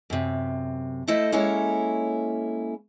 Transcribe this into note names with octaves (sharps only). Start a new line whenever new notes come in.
F#2 C3
A3 E4 A4 C5 D#5
G#3 A#3 C#4 E4 A4 C#5